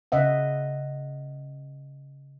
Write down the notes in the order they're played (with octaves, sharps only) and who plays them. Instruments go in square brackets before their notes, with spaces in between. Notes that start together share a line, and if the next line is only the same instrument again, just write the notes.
[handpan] C#3 D#5 E5 F#5